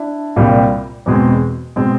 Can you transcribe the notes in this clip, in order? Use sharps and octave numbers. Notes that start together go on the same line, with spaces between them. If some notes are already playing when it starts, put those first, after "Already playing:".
Already playing: D4 E4
C2 A#2 G3 C4
E2 B2 G#3 C4
B2 G#3 C4